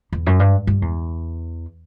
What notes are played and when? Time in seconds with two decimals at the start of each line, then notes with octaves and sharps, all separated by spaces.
0.13 E2
0.26 F#2
0.40 G2
0.67 G2
0.82 E2